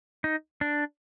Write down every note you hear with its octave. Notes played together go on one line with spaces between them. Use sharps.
D#4
D4